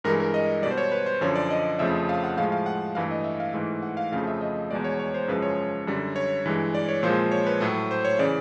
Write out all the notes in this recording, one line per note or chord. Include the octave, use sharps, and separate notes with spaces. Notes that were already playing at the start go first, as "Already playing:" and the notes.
G2 E3 G#3 A#4
A#4
D#5
B2 G3 D5
C5
C#5
B4
C5
F#2 D3 F3 C#5
D5
D#5
F2 C#3 F3 A3 E5
F5
F#5
A2 F3 G#3 F5
F5
F#5
G2 E3 A3 F5
D#5
E5
F5
G#2 E3 A3
F#5
F5
F2 C#3 F3 A3 F5
E5
D#5
E2 B2 G#3 D5
C#5
C#5
C5
F#2 C#3 F3 G#3 B4
C#5
F#2 D3 G3
C#5
G2 E3 G#3
D5
C#5
A#2 F3 G#3 C5
C#5
B4
A2 F#3 A3
C5
C#5
C#3 E3 D5